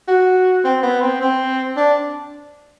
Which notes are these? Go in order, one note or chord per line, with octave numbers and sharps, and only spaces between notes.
F#4
C4
B3
C4
C4
D4